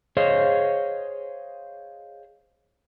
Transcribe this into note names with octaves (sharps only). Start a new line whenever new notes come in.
G#4 C5 C#5 D#5 F5